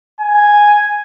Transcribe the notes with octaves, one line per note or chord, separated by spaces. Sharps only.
G#5